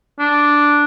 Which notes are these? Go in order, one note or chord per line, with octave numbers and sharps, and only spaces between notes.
D4